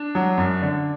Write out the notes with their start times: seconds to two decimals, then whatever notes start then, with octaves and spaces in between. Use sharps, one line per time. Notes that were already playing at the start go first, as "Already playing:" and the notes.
Already playing: D4
0.15 F#3
0.38 F#2
0.62 D3